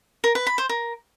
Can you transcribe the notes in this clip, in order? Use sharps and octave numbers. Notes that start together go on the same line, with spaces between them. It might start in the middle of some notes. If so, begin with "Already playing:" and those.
A#4
B4
B5
C5
A#4